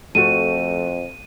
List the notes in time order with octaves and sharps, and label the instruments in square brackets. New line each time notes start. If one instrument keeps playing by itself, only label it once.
[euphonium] F2 [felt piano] F3 A3 F#4 [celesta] D#7